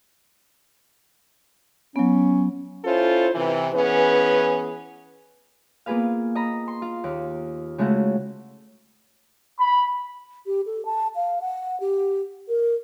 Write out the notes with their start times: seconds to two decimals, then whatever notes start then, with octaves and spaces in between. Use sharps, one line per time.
1.96 F#3 B3 C#4
2.85 C#4 E4 F4 A4 C5
3.34 C3 E3
3.73 E3 B3 C#4 G#4 B4
5.86 A#3 B3 F4 G#4 B4 F5
6.35 D#5 A#5 B5
6.68 C6
6.82 F4
7.04 D#2
7.78 C#3 G#3 A3 E4 F#4
9.59 B5
10.46 G4
10.66 A4
10.85 A5
11.15 F5
11.41 F#5
11.80 G4
12.48 A#4